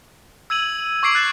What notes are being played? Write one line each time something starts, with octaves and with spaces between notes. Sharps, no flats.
E6 G#6 D#7 F#7
C#6 D6 G#6 C7 D7 F#7
F#6 A6 E7